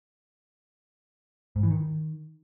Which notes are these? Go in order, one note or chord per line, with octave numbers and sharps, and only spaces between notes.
G#2
E3
D#3